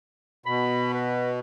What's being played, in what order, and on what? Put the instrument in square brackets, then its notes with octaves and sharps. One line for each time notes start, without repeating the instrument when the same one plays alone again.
[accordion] B2 [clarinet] B5
[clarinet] B4